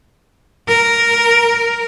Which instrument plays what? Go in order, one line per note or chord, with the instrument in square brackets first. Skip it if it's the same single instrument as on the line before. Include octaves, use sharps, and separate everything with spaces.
[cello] A#4